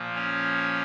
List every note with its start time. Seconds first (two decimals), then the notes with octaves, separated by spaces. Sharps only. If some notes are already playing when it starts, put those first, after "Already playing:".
Already playing: A#2 F3 A#3
0.15 C#4 C#5